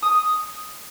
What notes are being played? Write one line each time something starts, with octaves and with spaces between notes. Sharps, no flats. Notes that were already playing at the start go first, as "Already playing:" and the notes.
D#6